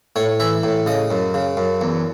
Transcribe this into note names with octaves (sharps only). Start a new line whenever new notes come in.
A2 C#5
E3 E5
A2
C#3 D#5
F#2
C#3
F#2
E2